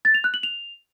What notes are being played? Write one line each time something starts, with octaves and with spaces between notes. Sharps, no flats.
A6
F7
F#6
F#7
F7